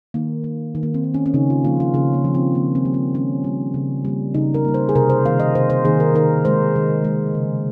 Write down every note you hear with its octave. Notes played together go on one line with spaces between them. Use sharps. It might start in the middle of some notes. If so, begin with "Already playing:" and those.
D#3 A#3
A#3
D#3
A#3
C4
A#3
C#4
C#4
C#3 D#4
F4
F3 A#3 F4
F4
C#3 C#4
A#3
F3 A#3
C4
D#3 A#3
C4
G3 A#3
C4
D#3 C#4
G3 A#3
C#3
G3 A#3
C#3 D#4
A#4
G3 A#3
C5
G#4
C3 A#4
C5
D#3 A#3 F5
D#5
C3 C5
C5
D#3 A#3 G#4
A#4
D#3 A#4
G#3 C5
D#3
G#3
C#3